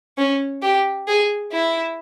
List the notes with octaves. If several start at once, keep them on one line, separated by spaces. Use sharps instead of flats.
C#4
G4
G#4
E4